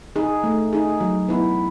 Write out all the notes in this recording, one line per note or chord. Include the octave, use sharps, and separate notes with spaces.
D#4 G#4
A3
D#4 G#4
F#3
B3 E4